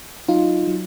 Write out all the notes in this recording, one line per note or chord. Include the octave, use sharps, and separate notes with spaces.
F#3 D#4 F4
F#3